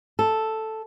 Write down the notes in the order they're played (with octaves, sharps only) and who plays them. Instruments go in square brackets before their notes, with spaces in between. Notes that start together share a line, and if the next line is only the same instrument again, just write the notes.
[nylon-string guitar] A4